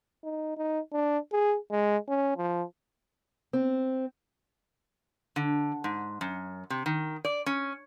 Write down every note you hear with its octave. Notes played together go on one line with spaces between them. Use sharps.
D#4
D#4
D4
G#4
G#3
C#4
F3
C4
D3
G#2
F#2
C3
D#3
D5
C#4